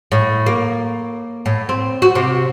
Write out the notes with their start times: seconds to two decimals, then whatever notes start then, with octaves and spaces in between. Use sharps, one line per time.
0.12 A2
0.46 A#3
1.46 A2
1.69 C4
2.02 F#4
2.15 C3